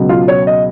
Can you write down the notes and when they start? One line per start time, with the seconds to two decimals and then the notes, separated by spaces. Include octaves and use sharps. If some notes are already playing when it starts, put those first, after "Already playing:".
Already playing: C#2 B2 F#3
0.09 F4
0.28 C#5
0.47 D#5